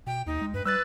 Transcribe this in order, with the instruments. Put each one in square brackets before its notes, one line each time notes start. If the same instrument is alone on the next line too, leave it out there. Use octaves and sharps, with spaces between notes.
[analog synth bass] B2 [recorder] G5
[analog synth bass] D#2 [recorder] D#4
[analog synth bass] G#3
[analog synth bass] G2 [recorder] B4
[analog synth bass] G3 [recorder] B4 [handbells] E6 F#6 A6